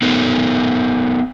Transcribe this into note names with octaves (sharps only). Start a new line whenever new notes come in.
B3 D#4 A4 A#4